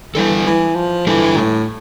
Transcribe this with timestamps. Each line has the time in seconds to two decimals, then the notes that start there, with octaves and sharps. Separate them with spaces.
0.15 E3 G3 D4 A4
0.46 E3
0.76 F3
1.07 E3 G3 D4 A4
1.37 A2